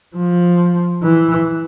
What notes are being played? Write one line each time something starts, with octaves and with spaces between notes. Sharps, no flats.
F3
E3